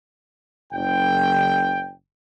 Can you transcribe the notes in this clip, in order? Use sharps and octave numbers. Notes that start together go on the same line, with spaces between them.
F#1 G5